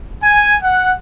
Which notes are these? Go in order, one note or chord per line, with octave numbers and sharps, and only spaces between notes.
G#5
F#5